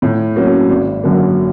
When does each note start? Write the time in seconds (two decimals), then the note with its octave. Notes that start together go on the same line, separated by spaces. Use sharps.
0.02 A2
0.36 F#3 A#3 C#4
0.69 G#1
1.03 F#2 D3 F#3 A#3